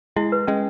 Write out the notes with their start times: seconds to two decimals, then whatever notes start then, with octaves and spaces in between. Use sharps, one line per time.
0.16 G#3 E4
0.32 B4
0.47 G#3 C#4